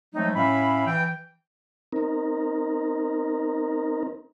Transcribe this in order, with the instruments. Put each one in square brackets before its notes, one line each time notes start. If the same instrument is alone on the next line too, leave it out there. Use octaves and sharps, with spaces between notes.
[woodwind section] F3 F#3 G#3 A3 C4 D#4
A2 C#4 E5 F5 B5
E3 G5
[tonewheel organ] C4 D#4 A#4